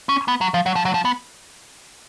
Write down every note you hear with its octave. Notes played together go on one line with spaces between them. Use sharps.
C#4
B3
F#3
F3
F#3
F3
F#3
F3
B3